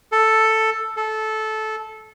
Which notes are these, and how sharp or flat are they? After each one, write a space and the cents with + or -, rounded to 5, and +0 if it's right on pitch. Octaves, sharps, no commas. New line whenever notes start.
A4 +5
A4 -15